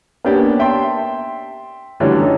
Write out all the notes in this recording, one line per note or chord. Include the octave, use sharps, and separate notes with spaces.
A#3 B3 C#4 D4 G4 G5
E5 G5 A5 C6
D3 E3 F#3 G3 A3 C#4
C#4 D#4 A4